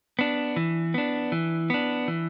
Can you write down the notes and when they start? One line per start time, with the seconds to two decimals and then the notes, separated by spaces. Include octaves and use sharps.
0.19 B3 D4
0.56 E3
0.94 B3 D4
1.32 E3
1.70 B3 D4
2.08 E3